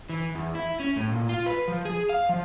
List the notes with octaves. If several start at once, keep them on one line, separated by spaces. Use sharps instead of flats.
E3
E2
E4
C#4
A2
A#2
F4
B4
F3
G#4
F5
F3